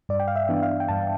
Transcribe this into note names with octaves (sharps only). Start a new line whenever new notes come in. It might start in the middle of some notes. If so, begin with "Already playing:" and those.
G2 D5
G5
F5
E5
E3 B3 D4
F5
G5
G2 A5